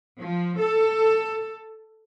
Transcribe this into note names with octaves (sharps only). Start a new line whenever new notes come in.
F3
A4